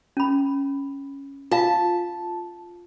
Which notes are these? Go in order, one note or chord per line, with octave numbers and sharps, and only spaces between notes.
C#4 B5
F4 F5 A5